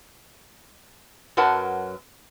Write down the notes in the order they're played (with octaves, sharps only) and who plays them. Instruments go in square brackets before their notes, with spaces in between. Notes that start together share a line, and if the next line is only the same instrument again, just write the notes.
[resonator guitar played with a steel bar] F#2 F#3 A#4 B4 F#5 A5